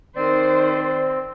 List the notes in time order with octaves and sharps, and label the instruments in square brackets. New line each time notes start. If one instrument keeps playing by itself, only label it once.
[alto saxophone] D#3 [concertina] C4 [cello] C5 [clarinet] D5